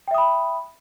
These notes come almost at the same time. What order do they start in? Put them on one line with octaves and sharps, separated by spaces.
G5 E5 D#6 B5